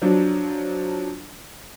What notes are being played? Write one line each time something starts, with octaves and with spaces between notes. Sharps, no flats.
F3 F#3 D4